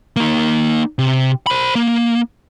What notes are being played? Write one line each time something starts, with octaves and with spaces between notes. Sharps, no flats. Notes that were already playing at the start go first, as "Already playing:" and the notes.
A#3 D#4
C3
C5 B5
A#3